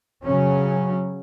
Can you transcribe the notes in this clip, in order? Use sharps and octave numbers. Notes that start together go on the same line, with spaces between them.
C#3 F#3 C#4